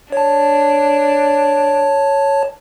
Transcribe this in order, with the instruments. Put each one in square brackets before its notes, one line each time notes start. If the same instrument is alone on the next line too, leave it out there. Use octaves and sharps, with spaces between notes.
[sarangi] D4 [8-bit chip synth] C#5 A5